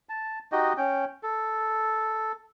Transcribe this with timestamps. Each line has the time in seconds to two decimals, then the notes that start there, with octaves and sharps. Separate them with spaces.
0.09 A5
0.52 D#4 F#4 G4 D#5
0.77 C#4 G5
1.23 A4